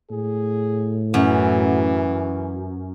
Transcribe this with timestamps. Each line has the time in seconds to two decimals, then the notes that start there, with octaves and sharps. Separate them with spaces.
0.10 A2 G#4
1.14 F#2 E3